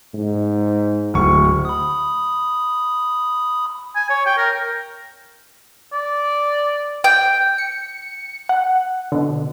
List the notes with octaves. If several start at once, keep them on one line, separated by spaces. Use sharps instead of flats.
G#2
D1 C#6
B5 D#6
G#5
C#5
G5
A#4
D5
G5
C#7
F#5
B2 D3